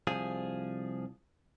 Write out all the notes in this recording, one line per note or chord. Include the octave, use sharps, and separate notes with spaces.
C2 F3 G#4